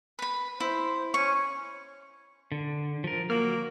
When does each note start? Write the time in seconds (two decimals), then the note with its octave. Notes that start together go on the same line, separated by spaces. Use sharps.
0.19 B4 B5
0.60 E4 C5
1.14 C#4 C#6
2.52 D3
3.04 F3 A#4
3.30 F#3 A#3 F#4 F6